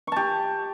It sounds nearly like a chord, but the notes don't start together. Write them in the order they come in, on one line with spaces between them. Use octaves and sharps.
C#6 A5 G4